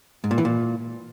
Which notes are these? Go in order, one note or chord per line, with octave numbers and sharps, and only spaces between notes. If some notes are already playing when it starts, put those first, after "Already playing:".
G#2
A#2
E3
A#2